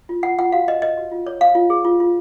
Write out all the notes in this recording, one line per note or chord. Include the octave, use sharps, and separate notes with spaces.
F4
F4 F#5
F4 F#5
F#4 F5
B4 D#5
B4 D#5
F#4
F4
C#5
C#5 F5
F4
G#4
F4
F4